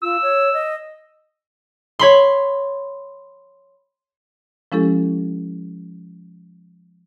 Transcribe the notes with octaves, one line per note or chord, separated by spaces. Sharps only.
F4 E6
C#5
D#5
C#5 B5 C6
F3 G#3 C#4 E4 G4 A4